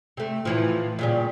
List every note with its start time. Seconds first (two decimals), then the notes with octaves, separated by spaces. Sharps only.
0.17 C3 A3
0.45 A2 E3 F3
0.99 A#2 C#3 G3